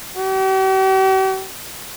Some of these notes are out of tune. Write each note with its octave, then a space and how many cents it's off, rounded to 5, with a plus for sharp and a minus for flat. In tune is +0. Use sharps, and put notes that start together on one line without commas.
G4 -45